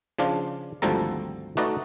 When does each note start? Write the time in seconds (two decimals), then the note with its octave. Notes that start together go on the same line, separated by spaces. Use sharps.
0.19 C#3 F3 D4 F4
0.82 G#1 D2 F3 G3 A4 A#5
1.57 A3 D#4 F#4 B4 D5 D#5